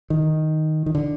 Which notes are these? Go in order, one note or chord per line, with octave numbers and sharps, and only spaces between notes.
D#3
D#3
D3